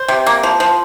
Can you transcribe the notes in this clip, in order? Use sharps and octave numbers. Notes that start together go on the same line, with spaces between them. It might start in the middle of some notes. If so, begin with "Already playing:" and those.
Already playing: C5
C3
A#3
F3
F3